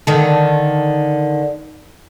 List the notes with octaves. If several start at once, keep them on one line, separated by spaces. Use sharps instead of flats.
D3 D#3 A4